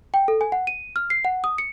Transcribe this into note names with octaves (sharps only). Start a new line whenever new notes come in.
G5
A4
G#5
F#5
D#7
F6
C7
F#5
D#6
C#7